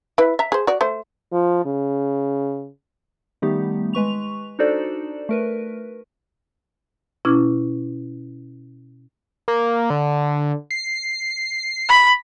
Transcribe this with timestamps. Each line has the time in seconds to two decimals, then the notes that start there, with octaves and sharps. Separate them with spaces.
0.18 E4 B4
0.39 E5 A#5
0.52 G#4 C5
0.67 F#4 D5
0.81 A3 C5
1.32 F3
1.65 C#3
3.42 D#3 G3 A3 B3 D#4 G4
3.93 G#3 B4 C#6 F7
4.59 D4 D#4 F#4 A4 C5 D5
5.29 A3 A#4 B4
7.25 B2 C#4 E4 D6 F6 G#6
9.48 A#3
9.90 D3
10.71 C7
11.89 B5